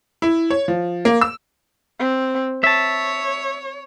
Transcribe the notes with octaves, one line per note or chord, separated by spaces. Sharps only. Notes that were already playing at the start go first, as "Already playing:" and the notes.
E4
C#5
F3
A#3
E6
C4
C#5 E5 A5